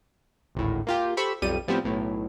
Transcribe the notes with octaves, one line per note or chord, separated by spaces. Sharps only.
G#1 D2 A2
A#3 F4 G4
G4 A4 C5 B5 C#6 E6
B1 F2 G3 G4 D#7
A2 F3 G3 B3 C4
B1 A2